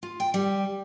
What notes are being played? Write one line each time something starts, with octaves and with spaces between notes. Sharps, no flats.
F4
G5
G3